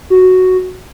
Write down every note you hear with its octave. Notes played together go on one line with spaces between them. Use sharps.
F#4